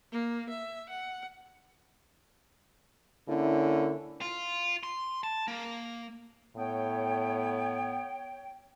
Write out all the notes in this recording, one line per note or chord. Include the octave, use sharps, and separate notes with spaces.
A#3
E5
F#5
D3 A#3 C#4 E4
F4
C6
A5
A#3
A2 B3 C#5 G5